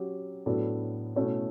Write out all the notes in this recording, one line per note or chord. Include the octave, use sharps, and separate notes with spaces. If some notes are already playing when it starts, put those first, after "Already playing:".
Already playing: F#3 C#4 G4
A2 F#3 B3 D4 A4
B2 A3 C#4 E4